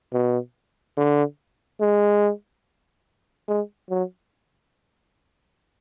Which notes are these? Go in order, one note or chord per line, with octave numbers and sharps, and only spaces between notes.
B2
D3
G#3
G#3
F#3